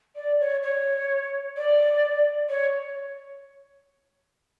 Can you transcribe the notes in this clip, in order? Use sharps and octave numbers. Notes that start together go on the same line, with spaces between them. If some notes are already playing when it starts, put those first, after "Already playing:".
D5
C#5
C#5
D5
C#5